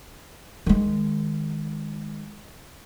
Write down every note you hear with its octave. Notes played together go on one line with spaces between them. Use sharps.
D#3 G#3